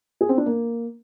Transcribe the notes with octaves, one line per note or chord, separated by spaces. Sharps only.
G#4
C4
D4
A#3